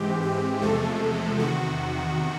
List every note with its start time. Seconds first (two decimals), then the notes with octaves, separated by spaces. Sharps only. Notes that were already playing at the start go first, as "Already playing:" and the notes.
Already playing: G#2 E3 G#3 C4 G4
0.23 G4
0.62 E2 C3 F3 G#3 A3 A4
1.39 E2 C3 D#3 F#4